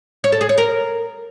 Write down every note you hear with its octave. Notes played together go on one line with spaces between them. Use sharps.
C#5
A4
G#4
C#5
A#4